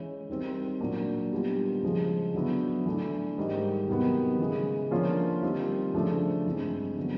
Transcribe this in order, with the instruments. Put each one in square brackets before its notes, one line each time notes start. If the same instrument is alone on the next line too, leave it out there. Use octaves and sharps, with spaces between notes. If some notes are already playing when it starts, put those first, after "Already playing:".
Already playing: [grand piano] E3 G#3 C#4 E4
D#3 G3 C4
A#2 F#3 A#3 D4
D#3 G3 B3 D4 F4
C#3 F3 G#3
D3 F#3 B3 E4
E3 A3 D4
G#2 D#3 G3
C3 D#3 F#3 B3
C#3 E3 G#3
D3 F3 A#3 C#4 F4
D#3 G3 C4 F4
C#3 F3 A3 D4
G2 E3 G#3 C4
D3 F#3 B3